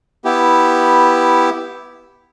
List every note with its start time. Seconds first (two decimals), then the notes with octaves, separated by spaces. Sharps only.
0.25 B3 E4 G4